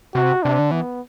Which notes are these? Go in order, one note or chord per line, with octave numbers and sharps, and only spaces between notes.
C3 F#4
C3 D4
D3
E3 B3